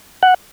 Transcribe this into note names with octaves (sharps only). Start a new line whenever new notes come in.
F#5